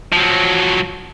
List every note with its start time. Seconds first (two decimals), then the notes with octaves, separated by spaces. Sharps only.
0.13 F3 F#3